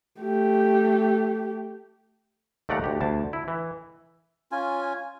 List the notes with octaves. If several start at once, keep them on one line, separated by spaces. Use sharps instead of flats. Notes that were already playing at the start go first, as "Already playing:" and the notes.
A3 G4
D#2 A3 D5 F#5 A#5
D2 G4
D2 A5
E4
E3
C#4 F4 G#5